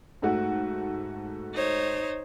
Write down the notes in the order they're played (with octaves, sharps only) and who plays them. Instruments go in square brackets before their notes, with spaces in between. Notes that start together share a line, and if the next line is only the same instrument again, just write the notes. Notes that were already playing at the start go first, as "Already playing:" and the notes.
[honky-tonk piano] G#2 A3 F#4
[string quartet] D#4 C5 C#5